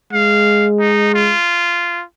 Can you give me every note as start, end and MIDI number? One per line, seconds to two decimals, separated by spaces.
0.13 1.34 56
0.13 0.66 77
0.80 1.13 63
1.14 2.04 65